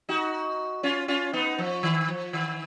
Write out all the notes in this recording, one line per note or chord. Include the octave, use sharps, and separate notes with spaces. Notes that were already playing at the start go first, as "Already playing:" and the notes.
D#4 F#4
C#4 F4
C#4 F4
B3 D#4
F3
D#3
F3
D#3